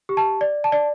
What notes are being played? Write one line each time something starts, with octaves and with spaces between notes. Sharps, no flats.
G4
A5
D5
A5
D5